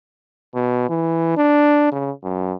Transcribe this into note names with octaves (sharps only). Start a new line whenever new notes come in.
B2
E3
D4
C#3
F#2